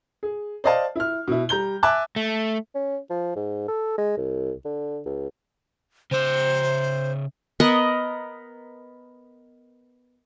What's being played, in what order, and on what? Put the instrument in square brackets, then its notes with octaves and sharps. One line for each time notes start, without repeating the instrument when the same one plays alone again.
[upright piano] G#4
C5 D5 D#5 F5 A5
E4 F6
B2 E4
G3 A#5 G6 G7
E5 G#5 A5 D6 F#6
[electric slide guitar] A3
[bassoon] C#4
F3
G#2
A4
G#3
C2
D3
C#2
[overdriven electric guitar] C#3 E5 [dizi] C5
[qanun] B3 A#4 D#5 F#5